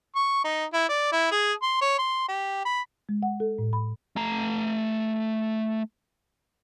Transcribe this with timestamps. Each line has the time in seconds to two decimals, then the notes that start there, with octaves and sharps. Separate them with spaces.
0.16 C#6
0.44 D#4
0.73 E4
0.89 D5
1.12 E4
1.31 G#4
1.62 C6
1.81 C#5
1.98 C6
2.28 G4
2.65 B5
3.09 G#3
3.23 F#5
3.40 A4
3.59 A2
3.73 B5
4.16 A3 A#5